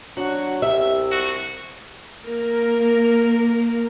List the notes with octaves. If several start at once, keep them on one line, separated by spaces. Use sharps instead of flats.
F#3 D4 F#4
C2 G4 E5
F#4
A#3 A#4